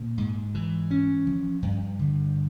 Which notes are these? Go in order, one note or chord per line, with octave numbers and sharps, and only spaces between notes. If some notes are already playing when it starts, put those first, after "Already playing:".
Already playing: A#2
G#2
E3
C#4
F3
G2
D3